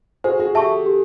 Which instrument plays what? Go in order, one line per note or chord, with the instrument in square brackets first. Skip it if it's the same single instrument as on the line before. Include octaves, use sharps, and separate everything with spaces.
[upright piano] F#4 G#4 [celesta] C5
[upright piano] F#4 G#4
[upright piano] G4 A4 [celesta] E5 A5 C#6
[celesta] G4